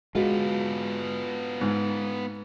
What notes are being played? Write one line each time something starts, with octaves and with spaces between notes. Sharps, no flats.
G#3 B3 F4 F#4
G#2